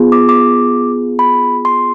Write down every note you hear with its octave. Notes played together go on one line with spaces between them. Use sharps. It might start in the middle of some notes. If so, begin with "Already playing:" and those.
Already playing: B3 F4 G#4
D6
D6
B5
C6